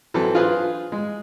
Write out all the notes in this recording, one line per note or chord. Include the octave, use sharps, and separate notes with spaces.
E3 F#3 C4 A4
D4 F4 G#4 B4 C5
G#3